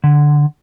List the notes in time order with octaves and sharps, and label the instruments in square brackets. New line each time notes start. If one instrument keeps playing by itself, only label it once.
[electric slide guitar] D3